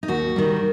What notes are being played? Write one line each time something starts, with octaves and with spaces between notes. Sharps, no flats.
D#4
D#2 F#4
D#3 G3